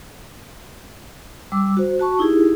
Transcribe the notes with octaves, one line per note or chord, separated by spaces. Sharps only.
G3 D6 E6
F#4 C5
F#4 A5 C#6
D#4 E4 G4 G#4